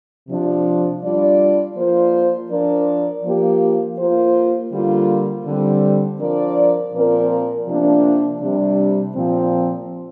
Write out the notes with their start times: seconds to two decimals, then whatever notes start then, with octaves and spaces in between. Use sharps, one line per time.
0.29 C3 F3 D4
1.02 G3 D4 F4 D5
1.77 F3 A#3 F4 C5
2.50 F3 D4 A#4 D5
3.24 F3 A#3 G4
3.98 A#3 F4 C5
4.72 D3 G3 A#3 F4
5.46 D3 G3 C4
6.20 F3 D4 A#4 D5
6.94 A#2 F3 C4 A#4 D5
7.68 C3 F3 A#3 D4
8.41 C3 G3 D4
9.15 A#2 F3 C4